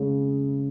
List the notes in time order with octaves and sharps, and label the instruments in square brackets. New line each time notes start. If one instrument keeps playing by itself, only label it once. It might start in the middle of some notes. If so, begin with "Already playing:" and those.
Already playing: [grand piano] C#3 G#3 [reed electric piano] C#4